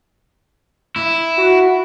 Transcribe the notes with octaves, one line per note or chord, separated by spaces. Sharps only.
E4
F#4